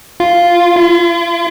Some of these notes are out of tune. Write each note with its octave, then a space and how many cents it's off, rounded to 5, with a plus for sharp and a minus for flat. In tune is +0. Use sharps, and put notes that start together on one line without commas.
F4 -5
F4 -45